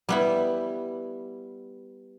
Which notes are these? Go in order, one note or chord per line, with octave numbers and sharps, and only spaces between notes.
G3 B3 E4